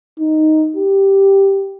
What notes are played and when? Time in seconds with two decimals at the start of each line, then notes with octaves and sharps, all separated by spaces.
0.19 D#4
0.76 G4